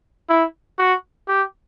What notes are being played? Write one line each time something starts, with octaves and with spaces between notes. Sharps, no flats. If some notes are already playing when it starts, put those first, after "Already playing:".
E4
F#4
G4